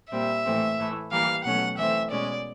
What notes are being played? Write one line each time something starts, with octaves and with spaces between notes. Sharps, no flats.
A#2 G3 C4 E5
A2 E3 A3 C4
A2 E3 A3
E3 G3 A#3 F5
B2 F#3 A3 C#4 F#5
E3 A3 C4 E5
B2 G#3 C#4 D5